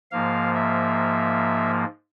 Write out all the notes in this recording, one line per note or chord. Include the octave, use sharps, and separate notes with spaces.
G#2 F3 A#3 F5
E5